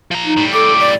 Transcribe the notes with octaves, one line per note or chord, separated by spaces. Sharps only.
F3 A#5
D#4
A2 G3
A4 D6
D5